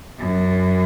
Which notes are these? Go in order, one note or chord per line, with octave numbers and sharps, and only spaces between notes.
F#2